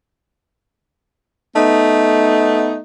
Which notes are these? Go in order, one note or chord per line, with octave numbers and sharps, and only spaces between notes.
A3 B3 D#4